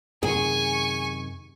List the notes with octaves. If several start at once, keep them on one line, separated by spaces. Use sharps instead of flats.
F#2 C3 D#3 G#4 G#5 C#6